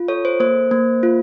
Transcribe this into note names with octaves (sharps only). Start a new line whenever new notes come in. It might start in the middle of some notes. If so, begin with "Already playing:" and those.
Already playing: F4
A4 C#5
C5
A#3 C5
A#3
F4